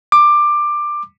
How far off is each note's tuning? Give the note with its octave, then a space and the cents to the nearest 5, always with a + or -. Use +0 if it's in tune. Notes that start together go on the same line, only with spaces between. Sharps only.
D6 +15